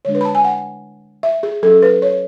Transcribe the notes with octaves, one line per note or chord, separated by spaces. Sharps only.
D3 G#3 D4 C#5
B4
B5
A5
G#5
F#5
E5
G#4
F#3 C#4 A4
B4
C#5